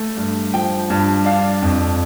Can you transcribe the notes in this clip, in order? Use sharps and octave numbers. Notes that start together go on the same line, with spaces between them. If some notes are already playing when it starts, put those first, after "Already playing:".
Already playing: A3
G2
F3 G5
G2
D4 F5
F2